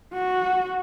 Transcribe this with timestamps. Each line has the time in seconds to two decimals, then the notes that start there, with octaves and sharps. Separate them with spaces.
0.13 F#4